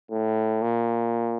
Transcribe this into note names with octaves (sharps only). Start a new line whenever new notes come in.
A2
A#2